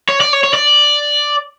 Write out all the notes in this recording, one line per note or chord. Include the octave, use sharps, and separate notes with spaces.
C#5
D5
C#5
C#5
D5